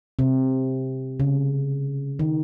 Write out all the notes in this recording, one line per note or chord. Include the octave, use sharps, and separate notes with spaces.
C3
C#3
D#3